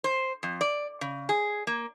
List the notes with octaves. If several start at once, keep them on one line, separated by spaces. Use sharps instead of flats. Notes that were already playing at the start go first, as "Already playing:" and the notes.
C5
F2
D5
C#3
G#4
A#3